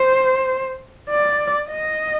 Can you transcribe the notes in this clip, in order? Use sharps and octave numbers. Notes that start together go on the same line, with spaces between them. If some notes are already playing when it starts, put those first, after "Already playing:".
Already playing: C5
D5
D#5